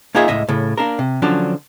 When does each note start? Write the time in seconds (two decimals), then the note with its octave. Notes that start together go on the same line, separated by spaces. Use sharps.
0.15 A#3 D#4 F4 G#4 C#5 E5
0.28 C#2 A2 D#5 E5
0.49 A2 C#3
0.78 A#3 D4 A#4
0.99 C3
1.22 D3 F3 F#3 C#4 D4